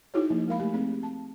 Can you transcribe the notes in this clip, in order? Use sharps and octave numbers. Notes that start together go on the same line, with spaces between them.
D#4 E4 F#4 G#4 C#5
F3 A#3
G#3 A#4 F5 B5
A3 G4
A3 C4 G#4
A5